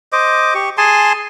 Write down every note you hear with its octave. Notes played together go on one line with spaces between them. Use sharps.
C5 D#5 D6
G4 C#6
G#4 G#5 A5 C6